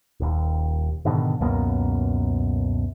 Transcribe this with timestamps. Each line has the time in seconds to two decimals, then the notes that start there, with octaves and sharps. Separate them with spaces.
0.20 D#1 D#2
1.05 G#2 B2 D3 D#3
1.40 C#2 F#2 B2 A#3